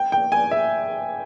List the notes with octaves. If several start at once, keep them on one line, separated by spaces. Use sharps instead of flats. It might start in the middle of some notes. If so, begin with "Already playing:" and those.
Already playing: G5
G5
G#5
E5